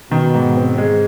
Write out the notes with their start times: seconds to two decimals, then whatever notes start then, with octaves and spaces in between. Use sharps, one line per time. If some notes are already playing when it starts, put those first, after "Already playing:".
0.11 B2 D#3
0.34 G#2
0.57 C4
0.78 G#3